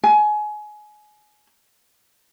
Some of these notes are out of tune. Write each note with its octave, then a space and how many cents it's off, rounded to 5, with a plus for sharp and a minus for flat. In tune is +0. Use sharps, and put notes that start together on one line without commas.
G#5 +25